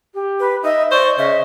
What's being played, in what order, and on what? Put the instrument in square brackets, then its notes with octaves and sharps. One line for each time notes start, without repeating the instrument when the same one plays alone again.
[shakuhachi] G4
[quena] B4
[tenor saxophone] D#4 [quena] D#5 [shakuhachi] E5
[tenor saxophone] C5 [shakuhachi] D5 [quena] C#6
[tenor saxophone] C#3 [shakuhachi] D#5 [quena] E5